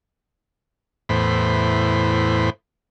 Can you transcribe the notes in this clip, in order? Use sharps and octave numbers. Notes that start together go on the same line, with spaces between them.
E2 A2 C5 B5